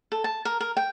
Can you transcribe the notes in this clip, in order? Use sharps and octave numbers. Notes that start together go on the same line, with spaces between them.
A4
A5
A#4
A#4
G5